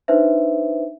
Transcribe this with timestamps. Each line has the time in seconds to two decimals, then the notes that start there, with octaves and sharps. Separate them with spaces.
0.08 D4 D#4 B4 C5 E5